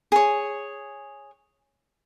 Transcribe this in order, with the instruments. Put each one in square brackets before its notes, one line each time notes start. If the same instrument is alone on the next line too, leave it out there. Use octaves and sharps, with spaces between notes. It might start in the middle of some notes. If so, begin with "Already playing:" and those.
[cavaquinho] G#4 C#5